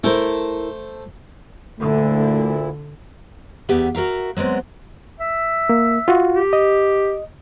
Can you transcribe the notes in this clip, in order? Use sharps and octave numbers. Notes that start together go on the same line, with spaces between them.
A3 E4 A4 A#4 C5
D2 A#2 D3 A3 E4
E2 B3 G4 E5 F5
F#4 A#4 E5 F5
F#3 G#3 B3 C4
E5
A#3
F4 F#4
G4
D#5